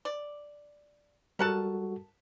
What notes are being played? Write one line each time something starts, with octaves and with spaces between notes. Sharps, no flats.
D5
G3 F#4 A4 A#4 F#5 A5